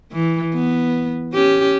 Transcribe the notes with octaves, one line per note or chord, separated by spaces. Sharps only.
E3
B3
C#4 G4